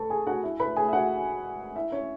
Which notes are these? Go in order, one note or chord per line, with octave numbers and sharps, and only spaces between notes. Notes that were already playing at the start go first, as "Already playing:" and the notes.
Already playing: A4 B4 A5 B5 C#6
G#4 G#5
F#4 F#5
E4 E5
B4 B5
G#4 G#5
E5
F#4 F#5
E4 E5
C#4 C#5